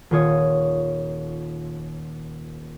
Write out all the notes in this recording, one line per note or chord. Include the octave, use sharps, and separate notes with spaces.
D#1 D#3 F4 C#5 D#6